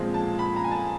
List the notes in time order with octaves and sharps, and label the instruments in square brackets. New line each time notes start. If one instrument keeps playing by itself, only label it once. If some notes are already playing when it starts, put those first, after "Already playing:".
Already playing: [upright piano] A#2 F3 G#3 C4
A5
B5
A#5
G#5
A5